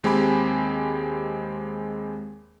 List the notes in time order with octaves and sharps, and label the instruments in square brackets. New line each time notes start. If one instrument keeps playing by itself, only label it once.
[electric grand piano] D#2 G#3 C4 G4 G#5 B5